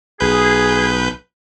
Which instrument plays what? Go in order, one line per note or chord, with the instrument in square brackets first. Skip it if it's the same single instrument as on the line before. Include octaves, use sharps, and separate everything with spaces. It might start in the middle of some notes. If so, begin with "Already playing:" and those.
[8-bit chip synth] B1 B4 G6 [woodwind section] G#4